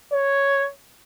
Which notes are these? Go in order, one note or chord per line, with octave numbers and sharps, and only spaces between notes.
C#5